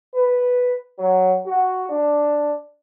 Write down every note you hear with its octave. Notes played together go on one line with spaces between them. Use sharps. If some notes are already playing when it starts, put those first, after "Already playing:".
B4
F#3
F#4
D4